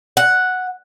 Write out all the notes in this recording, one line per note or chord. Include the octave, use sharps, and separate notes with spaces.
F#5